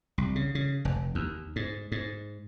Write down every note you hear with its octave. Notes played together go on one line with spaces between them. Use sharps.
C2
C#3
C#3
F1
D#2
G#2
G#2